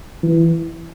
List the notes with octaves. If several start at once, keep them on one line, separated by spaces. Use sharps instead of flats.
E3